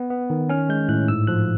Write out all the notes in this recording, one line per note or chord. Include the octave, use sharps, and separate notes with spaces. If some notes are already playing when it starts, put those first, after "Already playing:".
Already playing: B3
B3
D#3
C#4 F6
G#3 G6
A2 F#6
G#2 E6
F3 F#6